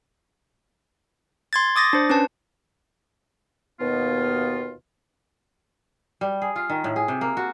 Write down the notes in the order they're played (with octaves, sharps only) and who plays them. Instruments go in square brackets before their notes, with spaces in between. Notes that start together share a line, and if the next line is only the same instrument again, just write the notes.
[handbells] C6 G#6 A6
D6 D#6 A6 A#6
D4 C5
C#4 D4 B4 A5
[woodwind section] D#2 B2 B3 F4
[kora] G3
G#4
F4
D#3
A2
G#4
C3
A#3
F#4